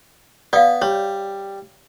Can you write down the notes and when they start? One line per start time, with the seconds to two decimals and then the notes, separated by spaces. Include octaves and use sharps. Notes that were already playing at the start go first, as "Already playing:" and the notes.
0.53 B3 D5 F5
0.82 G3 C#5